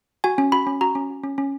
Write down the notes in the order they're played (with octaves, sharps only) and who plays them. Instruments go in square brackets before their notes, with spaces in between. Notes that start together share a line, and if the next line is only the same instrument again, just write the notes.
[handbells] F#4 G#5
C#4
F#4 B5
C#4
F#4 A#5
C#4
F#4
C#4
C#4